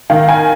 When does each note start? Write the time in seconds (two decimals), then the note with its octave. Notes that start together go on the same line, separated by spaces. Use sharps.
0.10 D#3 F5
0.29 G#5